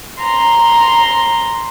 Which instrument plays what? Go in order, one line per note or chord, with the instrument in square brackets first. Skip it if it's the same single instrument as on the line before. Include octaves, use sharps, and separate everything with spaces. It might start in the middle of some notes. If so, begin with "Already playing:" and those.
[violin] A#5 C6